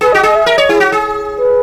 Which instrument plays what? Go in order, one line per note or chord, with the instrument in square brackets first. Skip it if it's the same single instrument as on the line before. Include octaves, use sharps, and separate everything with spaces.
[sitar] G#4 [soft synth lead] B4
[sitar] F#4 [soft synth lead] D#5
[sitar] G#4 [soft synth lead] D#5
[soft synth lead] E5
[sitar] A#4 [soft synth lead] E5
[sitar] C#5 [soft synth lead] D#5
[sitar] E4 [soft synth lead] G#4
[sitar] F#4
G#4
[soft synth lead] B4